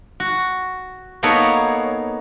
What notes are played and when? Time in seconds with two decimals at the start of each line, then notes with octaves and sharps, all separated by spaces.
0.20 F#4
1.23 A#3 B3 D#4 A4 B4 C#5